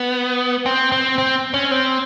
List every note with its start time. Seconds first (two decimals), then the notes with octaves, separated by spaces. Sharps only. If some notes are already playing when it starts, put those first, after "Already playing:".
Already playing: B3
0.66 C4
0.92 C4
1.18 C4
1.54 C#4
1.71 C4